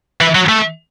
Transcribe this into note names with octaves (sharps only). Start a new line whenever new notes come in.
E3
F#3
A3